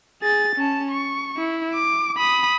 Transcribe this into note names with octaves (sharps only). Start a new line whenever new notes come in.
G#4 A6
C#4 A5
C#6
E4
D6
B5 D#6